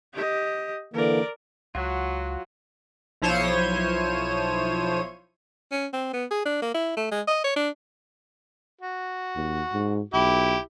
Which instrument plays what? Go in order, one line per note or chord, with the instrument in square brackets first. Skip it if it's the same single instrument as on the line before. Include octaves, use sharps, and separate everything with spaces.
[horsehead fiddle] G4 D#5
[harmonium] D3 E3 A#3 [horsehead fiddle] A#4 D5
[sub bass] C#2 [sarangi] F#3 [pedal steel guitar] F4 F#4
[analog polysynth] B1 F3 E4 C5 C#5 D#7
[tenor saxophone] C#4
C4
B3
G#4
D4
A#3
E4
A3
G#3
D#5
C#5
D4
[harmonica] F#4
[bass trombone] D#2
G#2
[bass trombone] B1 [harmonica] E4 G4